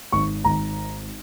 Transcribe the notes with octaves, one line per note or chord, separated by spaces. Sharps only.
G#1 C#6
G#1 A#5